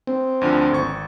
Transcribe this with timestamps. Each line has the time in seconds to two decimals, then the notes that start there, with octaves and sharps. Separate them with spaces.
0.07 C4
0.41 D2 D3 F3
0.71 G#1 C#6